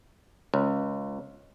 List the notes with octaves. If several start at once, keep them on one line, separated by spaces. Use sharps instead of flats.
C#2